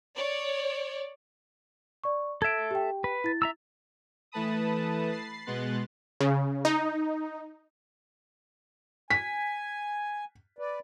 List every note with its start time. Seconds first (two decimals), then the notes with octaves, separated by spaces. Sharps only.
0.15 C#5 D5
2.04 D5 C#6
2.42 A4 E5 G#6 D7
2.71 G4 G5
3.04 B4
3.24 E4 A6
3.42 E5 A#5 E6
4.32 E3 A3 B4 A5 B5 D#6
5.12 B5 A6 C7
5.46 B2 G#3 B3 C6 F#6 A6
6.21 C#3
6.65 D#4
9.10 G#5 B6
10.59 B4 D5